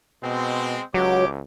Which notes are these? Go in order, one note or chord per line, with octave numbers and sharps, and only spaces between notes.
B2 G#3 C4
C#2 F#3 G4 C#5 D6